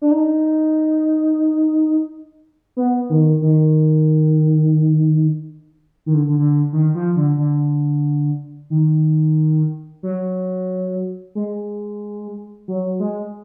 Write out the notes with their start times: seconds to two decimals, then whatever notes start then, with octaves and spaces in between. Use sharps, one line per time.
0.02 D4
0.11 D#4
2.77 B3
3.10 D#3
3.42 D#3
6.06 D#3
6.14 D3
6.29 D3
6.39 D3
6.73 D#3
6.95 F3
7.16 D3
7.38 D3
8.70 D#3
10.03 F#3
11.35 G#3
12.68 F#3
13.00 G#3